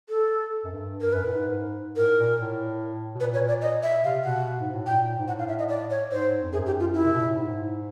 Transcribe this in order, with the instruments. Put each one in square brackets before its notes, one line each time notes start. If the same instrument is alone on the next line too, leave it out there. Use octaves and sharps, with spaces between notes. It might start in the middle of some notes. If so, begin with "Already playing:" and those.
[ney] A4
[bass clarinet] F#2
G2
[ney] A#4
[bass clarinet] F#2 [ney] B4
[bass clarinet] A2
G#2
[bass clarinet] A2 [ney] A#4
[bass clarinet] A#2
A2
B2
[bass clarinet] A#2 [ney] B4
[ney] C#5
D5
D#5
E5
[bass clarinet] C3 [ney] F5
[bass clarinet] B2 [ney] F#5
[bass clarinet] G#2
A2
[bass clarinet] A#2 [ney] G5
[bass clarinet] G#2
[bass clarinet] A2 [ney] F#5
[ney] F5
E5
D#5
D5
C#5
[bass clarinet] G#2 [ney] C5
[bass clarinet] F2
[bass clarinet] F#2 [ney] G#4
[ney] G4
F4
E4
[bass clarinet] C3
B2
A#2
A2
G#2